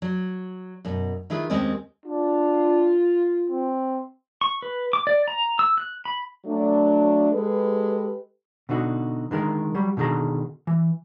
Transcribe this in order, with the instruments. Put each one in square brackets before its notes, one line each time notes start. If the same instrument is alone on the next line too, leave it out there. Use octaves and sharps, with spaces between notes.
[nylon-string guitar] F#3
F#2 B2
D#3 E4 F4 G#4 B4
D#2 G#3 C4 C#4 G4 D#5
[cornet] D4 [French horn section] F4
[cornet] C4
[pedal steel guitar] C#6
B4
D6
D5
A#5
E6
F#6
B5
[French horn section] F#3 A3 D4
G#3 G4 A4 B4
[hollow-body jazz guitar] B2 D3 D#4 F#4
D3 D#3 G#3 A#4
F#3 G3
B2 D3 D#3 G#4 A#5
E3